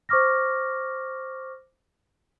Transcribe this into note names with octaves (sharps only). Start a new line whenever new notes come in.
C5 C#6 D6 F6 A#6